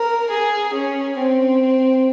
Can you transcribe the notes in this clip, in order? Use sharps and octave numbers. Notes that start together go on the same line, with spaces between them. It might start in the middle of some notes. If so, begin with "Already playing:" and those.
Already playing: A#4
G#4
C#4
C4